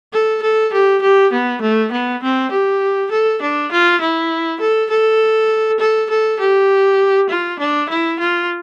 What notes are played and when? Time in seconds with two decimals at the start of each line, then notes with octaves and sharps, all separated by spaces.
0.13 A4
0.42 A4
0.73 G4
1.02 G4
1.32 B3
1.62 A3
1.91 B3
2.22 C4
2.51 G4
3.11 A4
3.42 D4
3.72 F4
4.01 E4
4.60 A4
4.90 A4
5.80 A4
6.10 A4
6.39 G4
7.29 F4
7.59 D4
7.89 E4
8.19 F4